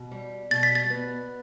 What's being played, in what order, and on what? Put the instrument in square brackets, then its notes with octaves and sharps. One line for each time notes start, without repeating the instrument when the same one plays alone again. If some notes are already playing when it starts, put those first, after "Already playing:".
Already playing: [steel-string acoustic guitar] B2
G3
[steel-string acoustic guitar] B2 [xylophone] A6
[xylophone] B6
A6
[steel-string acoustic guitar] B3